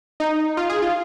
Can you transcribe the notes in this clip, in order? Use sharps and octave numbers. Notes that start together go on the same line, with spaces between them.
D#4
F4
G#4
F4